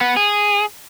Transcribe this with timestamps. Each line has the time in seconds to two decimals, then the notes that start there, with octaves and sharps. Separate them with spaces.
0.01 B3
0.16 G#4